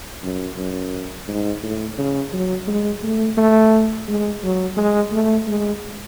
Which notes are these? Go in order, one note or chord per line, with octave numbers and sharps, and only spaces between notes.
F#2
F#2
G#2
A2
C#3
F#3
G#3
A3
A3
G#3
F#3
G#3
A3
G#3